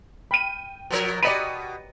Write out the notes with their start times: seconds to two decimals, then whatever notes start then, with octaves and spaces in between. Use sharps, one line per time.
0.31 G5 B5 F6 D#7
0.90 B2 F3 A#4
1.23 B2 G4 D5 D#5 B5 C#7 D#7